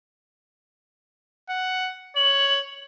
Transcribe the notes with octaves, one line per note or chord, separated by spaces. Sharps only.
F#5
C#5 F#7